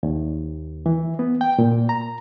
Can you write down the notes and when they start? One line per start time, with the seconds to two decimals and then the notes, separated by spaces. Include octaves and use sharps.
0.03 D#2
0.86 E3
1.19 B3
1.41 G5
1.59 A#2
1.89 A#5